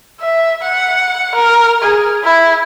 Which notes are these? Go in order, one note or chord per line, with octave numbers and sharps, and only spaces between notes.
E5
F#5
A#4
G#4
E4